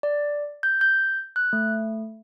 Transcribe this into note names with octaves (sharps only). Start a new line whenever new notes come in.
D5
G6
G6
F#6
A3